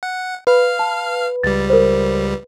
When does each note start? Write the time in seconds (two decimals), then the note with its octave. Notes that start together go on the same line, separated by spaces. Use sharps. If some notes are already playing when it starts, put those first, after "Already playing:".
0.03 F#5
0.47 B4 F5 F6
0.79 A5
1.43 C#2 G3 A6
1.70 A#4 C5